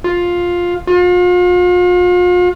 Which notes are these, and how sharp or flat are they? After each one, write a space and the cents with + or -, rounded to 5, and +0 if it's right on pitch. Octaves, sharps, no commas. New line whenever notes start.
F4 +10
F4 +40